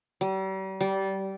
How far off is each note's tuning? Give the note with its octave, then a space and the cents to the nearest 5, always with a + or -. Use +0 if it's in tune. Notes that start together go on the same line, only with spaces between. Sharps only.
G3 -40
G3 -20